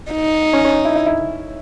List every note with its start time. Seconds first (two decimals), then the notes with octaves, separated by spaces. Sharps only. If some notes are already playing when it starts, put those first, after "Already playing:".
0.12 D#4
0.53 C#4
0.64 C#4
0.85 E4
0.96 E4
1.06 E4